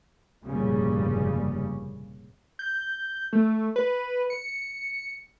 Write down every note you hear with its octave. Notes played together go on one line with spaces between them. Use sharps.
F1 G2 A#2 C#3 G3 C#4
G6
A3
B4
C#7